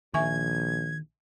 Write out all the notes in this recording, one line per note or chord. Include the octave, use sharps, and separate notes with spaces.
A#1 D#3 E5 G#5 C#6 G#6